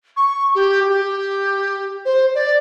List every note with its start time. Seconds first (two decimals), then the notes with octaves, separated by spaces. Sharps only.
0.16 C#6
0.55 G4
0.89 G4
2.05 C5
2.35 D5